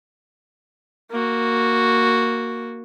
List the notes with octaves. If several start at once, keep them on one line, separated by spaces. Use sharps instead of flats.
A#3 F#4